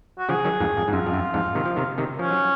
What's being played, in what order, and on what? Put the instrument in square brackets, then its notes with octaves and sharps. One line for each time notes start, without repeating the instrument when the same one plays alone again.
[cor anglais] F#4
[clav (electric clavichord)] C#3 F3 [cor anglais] G#4
[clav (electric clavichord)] D#3 F#3
F2 G#2
F2
G#2
[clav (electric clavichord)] F#2 [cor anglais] F4
[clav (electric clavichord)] F2
F#2
F2 G#2
C3 D#3
F3
C3 D#3
C3 D#3
[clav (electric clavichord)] F3 [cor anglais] C#4
[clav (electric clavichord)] F#3